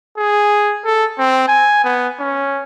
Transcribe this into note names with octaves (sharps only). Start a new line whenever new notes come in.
G#4
A4
C4
G#5
B3
C#4